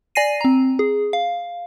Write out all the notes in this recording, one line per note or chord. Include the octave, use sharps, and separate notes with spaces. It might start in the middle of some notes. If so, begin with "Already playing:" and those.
D5 G#5 A#6 C7 D#7
C4 A#5
G#4
F5